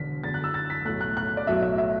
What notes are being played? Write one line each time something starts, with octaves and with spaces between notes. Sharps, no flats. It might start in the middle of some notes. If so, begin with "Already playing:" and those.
Already playing: E1 D3 B6
E2 D3 F#3 A6
F#6
E6
A6
B6
B1 A2 A3 F#6
F#6
F#6
D5
B1 A2 F#3 A3 E5
E5
E5